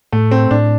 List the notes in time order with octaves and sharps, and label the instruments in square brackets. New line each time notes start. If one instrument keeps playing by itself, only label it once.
[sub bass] A2 [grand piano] A3
[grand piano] C4
[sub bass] A2 [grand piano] D4